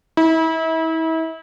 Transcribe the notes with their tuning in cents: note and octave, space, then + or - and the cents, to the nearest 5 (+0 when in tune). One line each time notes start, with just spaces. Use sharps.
E4 -35